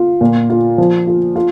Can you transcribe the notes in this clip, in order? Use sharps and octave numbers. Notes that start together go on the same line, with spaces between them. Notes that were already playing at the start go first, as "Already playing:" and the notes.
Already playing: F4
A#2
F4
F3
F4
F4